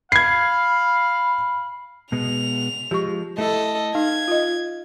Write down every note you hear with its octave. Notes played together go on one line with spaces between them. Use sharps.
F5 B5 G#6 C7
B2 G#3 B3 F7
F3 G#3 G4 C#6
A3 E4 A4 D#5
D#4 F5 G#6
F4 D#5